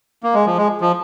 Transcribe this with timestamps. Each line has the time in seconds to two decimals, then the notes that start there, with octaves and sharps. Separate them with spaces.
0.23 A#3
0.34 G#3
0.46 F3
0.58 G#3
0.81 F3